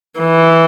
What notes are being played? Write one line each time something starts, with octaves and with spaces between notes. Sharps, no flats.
E3